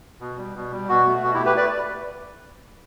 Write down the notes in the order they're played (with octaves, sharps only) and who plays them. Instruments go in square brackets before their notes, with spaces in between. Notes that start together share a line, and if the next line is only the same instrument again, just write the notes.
[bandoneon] B2
G3
B2
G3
B2 F#4
A3
B2 F#4
E4 G4
A3
G4 B4
B4 D5